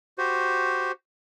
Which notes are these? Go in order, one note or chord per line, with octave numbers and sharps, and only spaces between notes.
F#4 G4 C5